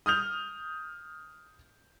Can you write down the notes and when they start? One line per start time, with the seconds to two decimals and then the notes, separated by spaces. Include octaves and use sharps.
0.06 D#6 F6 G6 F7